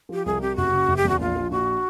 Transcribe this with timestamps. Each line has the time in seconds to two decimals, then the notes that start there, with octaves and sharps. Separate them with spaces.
0.09 F3 G4
0.26 C2 G#4
0.41 C3 G4
0.56 F#1 F#4
0.73 C#3
0.88 F#1
0.97 G4
1.05 E2 F#4
1.20 A#1 F4
1.35 F3
1.51 A#1 F#4